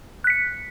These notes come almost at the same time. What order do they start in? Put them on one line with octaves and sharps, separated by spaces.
F#6 B6 C#7